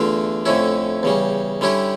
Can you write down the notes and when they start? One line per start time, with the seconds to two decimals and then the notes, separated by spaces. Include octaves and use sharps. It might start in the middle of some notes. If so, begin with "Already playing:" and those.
Already playing: E2 D3 A3 D4 F4
0.45 F2 D3 A3 C#4 E4
1.03 E2 C#3 G3
1.61 D3 G3 C#4 E4 G4